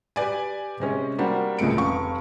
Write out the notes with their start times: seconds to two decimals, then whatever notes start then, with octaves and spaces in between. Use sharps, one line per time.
0.16 G4 B4 D5 G#5
0.80 C3 G#3 C#4
1.18 G3 A#3 C4 D4 F#4 G4
1.58 C#2 A#2 G#3 A3 C#7 D7
1.77 F1 F5 C#6